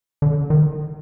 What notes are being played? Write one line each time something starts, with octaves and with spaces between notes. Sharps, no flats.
D3
D#3